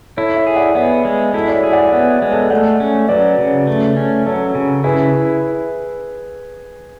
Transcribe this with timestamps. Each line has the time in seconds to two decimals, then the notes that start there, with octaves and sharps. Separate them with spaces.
0.17 E4 A4 C#5
0.36 C#5 E5
0.47 G#4
0.56 D5 F#5
0.75 B3 C#5 E5
1.05 G#3
1.33 E4 F#4 A4
1.48 D5
1.53 C#5 E5
1.64 G#4
1.73 D5 F#5
1.93 B3 C#5 E5
2.22 G#3
2.31 A4 C#5
2.50 A3 D5 F#5
2.80 C#4
3.09 F#3 B4 D5
3.38 C#3
3.67 A3
3.96 C#4
4.25 F#3 A4 C#5
4.55 C#3
4.84 E4 G#4 B4